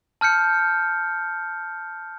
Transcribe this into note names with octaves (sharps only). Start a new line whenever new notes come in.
A5 F6 G6 C#7